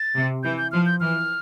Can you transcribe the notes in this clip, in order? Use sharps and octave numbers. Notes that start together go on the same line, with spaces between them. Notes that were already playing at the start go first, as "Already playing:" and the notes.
Already playing: A6
C3
E3 G6
G6
F3 F6
G6
E3 F6